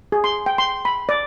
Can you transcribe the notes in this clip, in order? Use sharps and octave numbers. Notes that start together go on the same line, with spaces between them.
G#4
C6
G5
C6
B5
D5